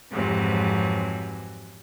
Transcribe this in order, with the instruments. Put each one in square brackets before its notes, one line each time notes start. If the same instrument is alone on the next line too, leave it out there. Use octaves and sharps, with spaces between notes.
[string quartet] F2 G#2 C3 E3 F#3